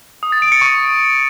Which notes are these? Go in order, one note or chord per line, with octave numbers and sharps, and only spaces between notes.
D#6
A6
D7
C#7
C#6